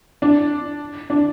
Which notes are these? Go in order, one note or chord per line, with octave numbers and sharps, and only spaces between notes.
D4
D4